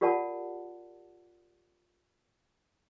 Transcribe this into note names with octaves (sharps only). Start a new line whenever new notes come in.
F4 G4 A#4 D5 F#5 A5